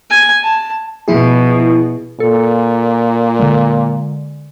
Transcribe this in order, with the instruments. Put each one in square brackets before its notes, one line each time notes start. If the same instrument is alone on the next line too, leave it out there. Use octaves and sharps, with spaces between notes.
[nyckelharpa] G#5
A5
[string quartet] B2 [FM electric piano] F3 E4 G#4
[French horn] A#2 [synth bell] A4
[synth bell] D3 G#3